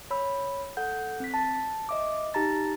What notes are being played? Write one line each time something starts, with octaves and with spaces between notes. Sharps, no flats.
C#5 B5 E6
A4 F#5 G6
C4 B6
A5 A6
D#5 E5 D6
D#4 G4 A5 A#5 A6